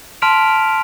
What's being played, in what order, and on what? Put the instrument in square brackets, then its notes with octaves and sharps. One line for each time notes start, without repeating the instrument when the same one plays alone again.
[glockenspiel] A5 C6 F6 B6 D7 F7